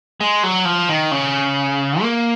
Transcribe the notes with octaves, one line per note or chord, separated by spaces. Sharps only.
G#3
F#3
F3
D#3
C#3
A#3